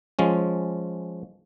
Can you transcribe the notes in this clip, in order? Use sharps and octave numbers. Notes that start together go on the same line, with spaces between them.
F3 G#3 C#4